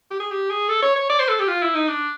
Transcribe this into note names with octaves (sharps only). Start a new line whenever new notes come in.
G4
G#4
G4
G#4
A4
C#5
C#5
D5
C5
A4
G4
F4
E4
D#4
D4